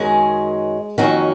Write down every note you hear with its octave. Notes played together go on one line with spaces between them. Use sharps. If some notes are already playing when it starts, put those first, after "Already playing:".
Already playing: F#2 D#3 F#3 G#3 C#4 G#4
F2 D#3 F#3 A#3 C#4 F#4